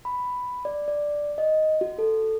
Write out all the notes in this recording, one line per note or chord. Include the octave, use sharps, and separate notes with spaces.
B5
D5
D5
D#5
F#4
A4